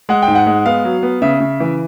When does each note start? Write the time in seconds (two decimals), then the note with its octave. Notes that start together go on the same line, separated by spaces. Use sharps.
0.09 G#3 F#5
0.22 G5
0.28 G#2
0.35 F#5
0.47 G#3
0.66 B3 F5
0.85 F#3
1.03 B3
1.22 C#3 E5
1.40 C#3
1.60 E3